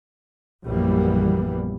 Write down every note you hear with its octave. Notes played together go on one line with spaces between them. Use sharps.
A#1 F#2 E3 G3 A#3 B3